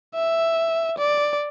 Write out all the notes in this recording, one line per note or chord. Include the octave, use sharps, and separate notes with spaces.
E5
D5